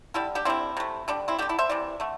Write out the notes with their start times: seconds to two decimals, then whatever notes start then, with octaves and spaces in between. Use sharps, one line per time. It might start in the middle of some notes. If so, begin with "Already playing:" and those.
0.14 D3 G3 E4 A4
0.35 D4 G4
0.45 D3 G3 C4 E4
0.77 C3 A3
1.08 D3 G3 D4
1.28 C4 E4
1.39 D3 A3 D4 G4
1.49 E4 A4
1.59 C5 E5
1.70 C3 E3 D5
2.00 D3 A3